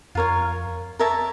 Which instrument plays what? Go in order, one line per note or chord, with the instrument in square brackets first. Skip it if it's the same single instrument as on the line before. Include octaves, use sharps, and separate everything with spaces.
[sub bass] F2 [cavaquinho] F4 A#4 C#5 F5
[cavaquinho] A#4 C#5 E5 A5